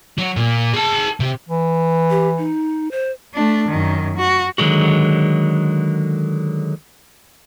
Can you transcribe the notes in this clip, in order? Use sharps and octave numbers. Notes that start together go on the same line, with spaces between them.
F#3
A#2
G#4 A5
C3
E3
G4
D#4
C5
A3 D4
F#2 D#3
F#4
D3 D#3 F#3 G#3 F#4